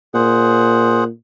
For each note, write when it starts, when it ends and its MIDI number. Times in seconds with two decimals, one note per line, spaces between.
0.14 1.09 46
0.14 1.04 68
0.14 1.04 72
0.14 1.04 78